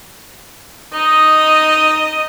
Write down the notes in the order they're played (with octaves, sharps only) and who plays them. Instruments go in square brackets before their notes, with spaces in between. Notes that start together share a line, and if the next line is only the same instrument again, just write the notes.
[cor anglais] D#4 [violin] D#5